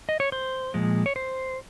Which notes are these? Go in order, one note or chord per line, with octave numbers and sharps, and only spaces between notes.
D#5
C#5
C5
A#2 F3 G#3
C#5
C5